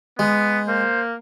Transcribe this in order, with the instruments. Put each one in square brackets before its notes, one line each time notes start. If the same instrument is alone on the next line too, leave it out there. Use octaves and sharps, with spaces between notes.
[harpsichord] G#3 [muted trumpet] B3
[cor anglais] A#3 [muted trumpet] C5